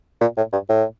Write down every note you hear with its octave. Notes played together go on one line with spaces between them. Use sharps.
A#2
A2
G2
A2